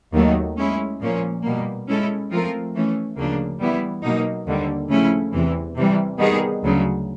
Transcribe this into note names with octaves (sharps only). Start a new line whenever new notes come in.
D#2 D#3 F#3 A3
G#3 C#4 E4
A#2 F3 A#3 C#4
B2 G3 A#3
G#3 C#4 E4 A4
F3 A3 C4 F4 A#4
E3 A3 C#4
D2 C#3 F3 A#3 D4
E3 G3 B3 E4
B2 F#3 A#3 D#4
D#2 D3 G3
C#3 F3 A3 C#4 E4
E2 C3 E3
C3 E3 G3
D#3 G3 B3 D#4 G#4
D2 C#3 F#3